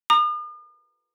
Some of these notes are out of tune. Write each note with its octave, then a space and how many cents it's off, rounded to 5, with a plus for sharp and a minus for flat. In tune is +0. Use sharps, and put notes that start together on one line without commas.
A#5 +0 D#6 -45